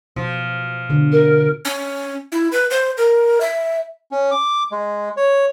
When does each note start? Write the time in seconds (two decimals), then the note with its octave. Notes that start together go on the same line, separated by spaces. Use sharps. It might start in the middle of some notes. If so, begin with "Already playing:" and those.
0.16 B2 F3
0.89 B2 D3
1.12 A#4
1.65 C#4
2.32 E4
2.52 B4
2.71 C5
2.97 A#4
3.41 E5
4.11 C#4
4.31 D6
4.71 G#3
5.17 C#5